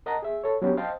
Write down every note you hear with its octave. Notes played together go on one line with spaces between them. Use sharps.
A#4 D#5 F#5 A5 A#5
G#4 E5
A4 C#5
F#3 B3 C#4 D4 G4
C5 D#5 F5 G5 A5